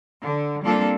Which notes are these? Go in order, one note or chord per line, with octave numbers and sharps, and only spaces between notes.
D3
G3 A#3 C4 D4 F4 A4